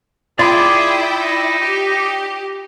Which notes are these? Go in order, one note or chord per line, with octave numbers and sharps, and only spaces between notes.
E4 F4 G#4 D5 G5 B5 D6
D#4
G4